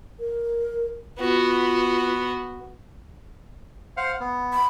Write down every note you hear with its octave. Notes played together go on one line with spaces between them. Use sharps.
A#4
B3 F4 F#4
C5 F5 F#5
B3
B5